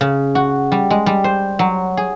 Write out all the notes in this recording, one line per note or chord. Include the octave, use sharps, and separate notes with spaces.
C#3
F#4
G3
G#3
G3
C5
F#3
G#4